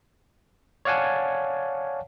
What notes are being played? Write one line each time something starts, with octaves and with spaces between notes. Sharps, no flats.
C#5 D5 F5 F#5 G#5 A5